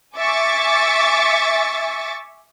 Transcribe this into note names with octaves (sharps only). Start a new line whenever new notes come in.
E5 G#5 C#6 D6 A6